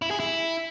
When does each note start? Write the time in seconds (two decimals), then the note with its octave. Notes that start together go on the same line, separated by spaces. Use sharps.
0.02 E4
0.11 G#4
0.20 E4